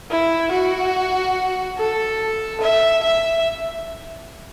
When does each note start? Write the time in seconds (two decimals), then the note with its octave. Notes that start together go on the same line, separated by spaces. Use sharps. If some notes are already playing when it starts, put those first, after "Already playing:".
0.10 E4
0.52 F#4
1.78 A4
2.61 E5
3.04 E5